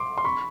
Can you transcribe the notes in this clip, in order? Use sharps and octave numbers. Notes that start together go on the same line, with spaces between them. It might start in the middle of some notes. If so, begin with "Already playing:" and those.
Already playing: C6 D6
C6
B5 C#6